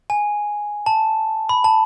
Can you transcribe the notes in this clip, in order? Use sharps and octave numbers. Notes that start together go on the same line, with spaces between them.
G#5
A5
B5
A5